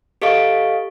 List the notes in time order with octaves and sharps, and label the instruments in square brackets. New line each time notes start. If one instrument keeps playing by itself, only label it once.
[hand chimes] G4 A4 D#5 F5 C#6